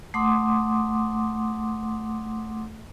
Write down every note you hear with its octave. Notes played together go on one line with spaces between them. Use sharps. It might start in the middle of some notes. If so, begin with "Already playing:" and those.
A3 F#5 C6 D6 D#6